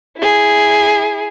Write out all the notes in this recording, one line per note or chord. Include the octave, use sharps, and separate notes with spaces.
E4 G#4